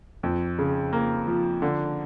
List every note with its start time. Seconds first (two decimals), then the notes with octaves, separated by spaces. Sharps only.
0.23 F2
0.58 C#3
0.93 A#3
1.28 F3
1.62 D3